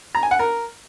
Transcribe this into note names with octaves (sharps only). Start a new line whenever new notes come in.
A#5
G#5
F#5
A#4